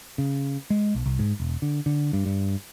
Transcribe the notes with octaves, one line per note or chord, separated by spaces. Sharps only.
C#3
G#3
B1
C2
G#2
E1
D3
D3
G2
G2